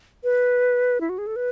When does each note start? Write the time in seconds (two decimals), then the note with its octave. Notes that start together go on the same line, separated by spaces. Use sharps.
0.24 B4
1.01 E4
1.09 F#4
1.18 G#4
1.27 A4
1.36 B4